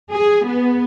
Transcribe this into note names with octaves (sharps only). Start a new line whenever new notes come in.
G#4
B3